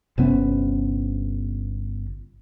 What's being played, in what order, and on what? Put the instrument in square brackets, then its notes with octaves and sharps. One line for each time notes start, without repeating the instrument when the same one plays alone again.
[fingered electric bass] G1 C3 B3 C#4